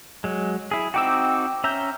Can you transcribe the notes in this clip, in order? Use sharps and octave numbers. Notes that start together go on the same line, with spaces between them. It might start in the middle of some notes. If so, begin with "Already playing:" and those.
F#3 G#3
E4 G#4
C4 D#4 F#4 G5 D6 E6
C#4 E5 A#5 E6 G6